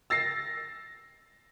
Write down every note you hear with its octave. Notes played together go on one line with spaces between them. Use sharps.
E6 A6 A#6 C7